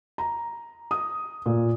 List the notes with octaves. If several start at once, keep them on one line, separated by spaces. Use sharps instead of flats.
A#5
D#6
A#2